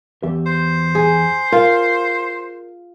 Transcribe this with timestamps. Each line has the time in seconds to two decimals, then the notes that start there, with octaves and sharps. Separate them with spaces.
0.23 E2 G4 E5
0.46 C5
0.95 G#4
1.52 F4 A#4